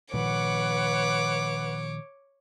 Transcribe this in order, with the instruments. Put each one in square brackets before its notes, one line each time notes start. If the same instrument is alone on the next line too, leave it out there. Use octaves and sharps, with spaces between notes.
[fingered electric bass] A#2 D#3 F3 [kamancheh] B4 F#5 [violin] C#5 D6